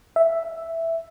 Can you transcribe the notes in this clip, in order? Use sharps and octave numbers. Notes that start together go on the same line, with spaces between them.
E5